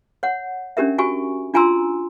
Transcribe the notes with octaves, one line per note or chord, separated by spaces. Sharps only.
C#5 F#5
C#4 D4 G4 A#4 E5
F#4 G4 G#5 C#6
D4 F4 G#5 A#5 C6 E6